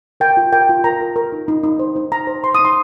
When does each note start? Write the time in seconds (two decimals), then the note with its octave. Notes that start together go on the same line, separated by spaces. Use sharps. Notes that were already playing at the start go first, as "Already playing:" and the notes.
0.20 A#4 G5
0.37 F4
0.52 A#4 G5
0.69 F4
0.84 A#4 A#5
1.01 A#4
1.16 A#4
1.32 D#4
1.48 D#4
1.63 D#4
1.79 C5
1.96 D#4
2.12 D#4 A#5
2.27 C5
2.44 C5 C6
2.55 D#6
2.59 D#4
2.65 C6